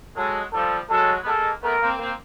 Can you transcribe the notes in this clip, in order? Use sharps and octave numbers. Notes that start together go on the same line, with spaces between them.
F#3 G#3 A4
F3 G3 A4
F#3 G#3 A4
B3
G#3 A#3 A4
A3 B3 A#4
A#3 C4
A#3 C4